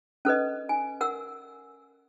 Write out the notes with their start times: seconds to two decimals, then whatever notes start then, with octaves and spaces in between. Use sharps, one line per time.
0.25 C#4 A4 B4 D#5
0.69 G#5
1.01 A#4 F#5 E6